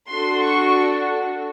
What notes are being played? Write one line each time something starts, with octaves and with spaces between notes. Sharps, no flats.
D4 F#4 A4 C6
C#6